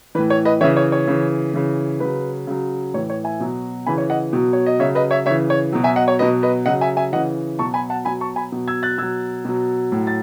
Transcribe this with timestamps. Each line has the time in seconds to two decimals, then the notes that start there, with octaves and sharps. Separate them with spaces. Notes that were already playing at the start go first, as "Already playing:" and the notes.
0.15 E3 B4
0.18 A2
0.30 C#5
0.45 B4 D#5
0.61 E3 C#5 E5
0.64 C#3
0.77 C#5
0.92 C#5
1.07 C#3 E3
1.54 C#3 E3
2.00 C#3 F#3 B4
2.47 C#3 F#3
2.94 A2 E3 C#5
3.10 C#5
3.24 E5 G#5
3.40 B2 F#3
3.86 C#3 E3 G#5 B5
3.98 C#5
4.10 D#5 F#5
4.33 B2 F#3
4.53 C#5
4.66 D#5
4.80 C#3 F#3 C#5 E5
4.95 B4 D#5
5.11 C#5 E5
5.26 C#3 C#5 E5
5.31 E3
5.50 C#5
5.72 B2 F#3
5.84 E5 G#5
5.96 D#5 F#5
6.08 C#5
6.19 B2 F#3 B4 D#5
6.43 B4 D#5
6.66 C#3 F#3 D#5 F#5
6.81 E5 G#5
6.97 E5 G#5
7.12 E3 D#5 F#5
7.16 C#3
7.59 B2 F#3 A5 C#6
7.74 G#5 B5
7.90 F#5 A5
8.05 B2 F#3 G#5 B5
8.21 A5 C#6
8.36 G#5 B5
8.52 B2 F#3
8.67 E6 G#6
8.83 F#6 A6
8.98 B2 F#3 E6 G#6
9.45 B2 F#3
9.92 A2 F#3
10.07 A6